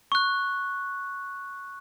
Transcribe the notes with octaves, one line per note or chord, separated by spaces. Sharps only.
C#6 F#6